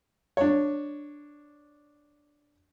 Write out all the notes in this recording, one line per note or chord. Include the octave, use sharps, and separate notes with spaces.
D4 C#5